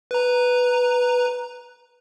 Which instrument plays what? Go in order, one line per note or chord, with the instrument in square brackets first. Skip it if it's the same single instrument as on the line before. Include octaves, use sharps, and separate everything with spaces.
[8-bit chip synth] B4 A#5